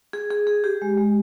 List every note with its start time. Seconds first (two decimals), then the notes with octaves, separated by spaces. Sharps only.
0.13 G#4
0.31 G#4
0.47 G#4
0.64 G4
0.82 G#3
0.97 G#3